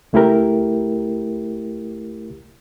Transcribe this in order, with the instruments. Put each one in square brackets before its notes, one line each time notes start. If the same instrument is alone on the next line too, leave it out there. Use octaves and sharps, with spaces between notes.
[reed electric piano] C#2 A3 E4 G4 A#4